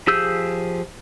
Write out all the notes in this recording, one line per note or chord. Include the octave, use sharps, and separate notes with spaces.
F3 G4 G#4 E6 G6